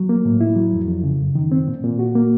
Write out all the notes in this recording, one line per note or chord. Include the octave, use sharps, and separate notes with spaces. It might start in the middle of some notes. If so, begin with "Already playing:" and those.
Already playing: F#3
A#3
A2
E4
F#3
F2
F2
C#3
F#2
D#3
C4
A#2
A#2
F#4
A#3